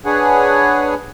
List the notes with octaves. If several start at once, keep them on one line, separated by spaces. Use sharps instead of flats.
D4 G#4 B4 C#5 F#5 G#5